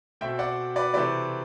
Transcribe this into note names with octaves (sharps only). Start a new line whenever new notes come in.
B2 A3 C4 E5 G5
D5 F#5
B4 D5
C3 E3 A3 C4 B4 D5